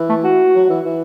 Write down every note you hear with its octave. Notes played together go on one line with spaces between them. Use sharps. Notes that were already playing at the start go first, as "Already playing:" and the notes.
Already playing: E3
A3
F#4
F#3
E3
E3